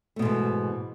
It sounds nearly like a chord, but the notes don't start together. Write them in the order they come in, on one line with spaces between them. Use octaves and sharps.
A3 B2 G#2 E3